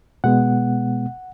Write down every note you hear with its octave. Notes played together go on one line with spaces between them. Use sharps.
B2 G#3 B3 F#5